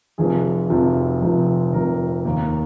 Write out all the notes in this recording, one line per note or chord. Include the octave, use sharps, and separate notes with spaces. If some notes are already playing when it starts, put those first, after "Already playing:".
F1 F2 C3 F3 G#4
F1 F2 C3 F3
F1 F2 C3 F3
F1 F2 C3 F3 A#4
D#2 D#3 A#3